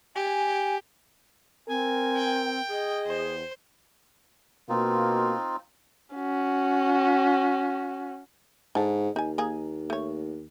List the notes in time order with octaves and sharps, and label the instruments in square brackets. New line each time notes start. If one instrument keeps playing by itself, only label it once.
[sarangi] G4 [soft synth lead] G#5
[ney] C4 [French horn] A#4 [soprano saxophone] G#5
[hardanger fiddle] G5
[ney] G#4 [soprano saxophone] D#5
[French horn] E2 [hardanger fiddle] C5
[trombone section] B2 A#3 [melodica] C4 D#4 F4
[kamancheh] C#4 F#4
[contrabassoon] G#2 [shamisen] D3 A5
[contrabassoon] D#2 [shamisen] D#4 G#5
[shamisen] A#3 D#4 G#4
A3 C#5